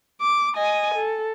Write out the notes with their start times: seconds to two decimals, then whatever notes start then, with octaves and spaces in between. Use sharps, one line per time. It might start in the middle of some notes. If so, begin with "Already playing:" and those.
0.21 D6
0.55 D#5 G#5
0.94 A4